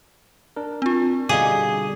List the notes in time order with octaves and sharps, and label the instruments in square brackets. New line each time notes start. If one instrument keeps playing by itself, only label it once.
[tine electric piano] D4 A#4
[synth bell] C4 F4
[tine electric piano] B2 D3 G3 [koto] G#4 [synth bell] D#5 F5 D6